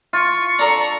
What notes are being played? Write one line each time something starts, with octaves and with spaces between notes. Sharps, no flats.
F4 C#6
D4 A4 D5 A#5